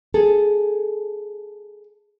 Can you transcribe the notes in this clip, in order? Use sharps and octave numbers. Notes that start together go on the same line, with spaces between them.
G#4 A4